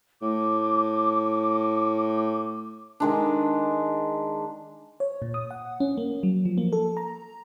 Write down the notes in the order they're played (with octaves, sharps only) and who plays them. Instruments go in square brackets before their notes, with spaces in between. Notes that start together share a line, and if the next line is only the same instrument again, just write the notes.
[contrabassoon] A2 [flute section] D6
[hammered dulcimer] D#3 G#3 D4
[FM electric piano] C#5
A#2
D#6
F#5
C#4
A#3
F#3
F3
A#3
A4
A#5